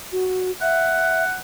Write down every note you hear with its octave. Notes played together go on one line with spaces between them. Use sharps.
F#4
E5 F#5